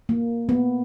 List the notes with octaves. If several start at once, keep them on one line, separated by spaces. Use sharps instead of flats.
A#3
B3